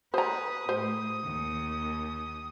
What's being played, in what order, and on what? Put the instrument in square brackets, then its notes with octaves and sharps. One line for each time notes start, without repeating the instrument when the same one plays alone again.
[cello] B4 [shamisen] C5 A#5 [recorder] D#6
[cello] A2 [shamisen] C5
[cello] D#2